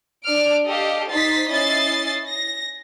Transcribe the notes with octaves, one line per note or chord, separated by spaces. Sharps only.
D4 F6 D7
G4 A4 D#5 F5
D#4 C5 A6 B6 C7
C#4 E4 D#5 A6 C7
A#6